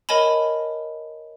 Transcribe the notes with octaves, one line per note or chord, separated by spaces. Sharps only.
A#4 C#5 D#5 G#5 A5 B5